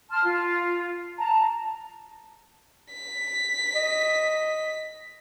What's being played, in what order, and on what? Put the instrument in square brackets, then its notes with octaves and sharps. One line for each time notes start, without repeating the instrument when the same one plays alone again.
[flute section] A5 C6 F6
F4
A5 A#5
[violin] B6
[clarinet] D#5